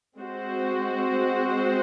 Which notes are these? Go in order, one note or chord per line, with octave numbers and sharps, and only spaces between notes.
G#3 C4 F#4 C5